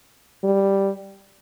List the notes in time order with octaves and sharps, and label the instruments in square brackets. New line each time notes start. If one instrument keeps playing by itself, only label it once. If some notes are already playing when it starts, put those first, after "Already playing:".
[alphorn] G3